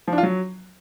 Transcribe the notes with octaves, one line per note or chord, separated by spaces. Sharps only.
F3
D4
F4
F#3